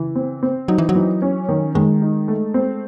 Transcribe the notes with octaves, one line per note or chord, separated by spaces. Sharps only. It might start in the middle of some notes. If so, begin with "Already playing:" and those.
Already playing: C#3 E3
C4
C4
F#3 D#4
E3
F#3
E3
C#4
D#3
D#3 G#3
D#4
A3
C4